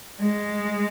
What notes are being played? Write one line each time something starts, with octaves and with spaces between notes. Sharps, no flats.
G#3